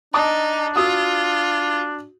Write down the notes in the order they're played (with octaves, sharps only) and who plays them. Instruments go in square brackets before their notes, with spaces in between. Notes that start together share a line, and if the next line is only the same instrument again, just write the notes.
[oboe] D4 [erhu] D#4 [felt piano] A5 D6 D#6
[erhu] F4 [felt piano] F#4 D#6 E6